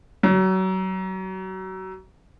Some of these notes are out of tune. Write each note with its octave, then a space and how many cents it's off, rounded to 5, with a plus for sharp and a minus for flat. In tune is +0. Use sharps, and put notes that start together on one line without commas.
F#3 +30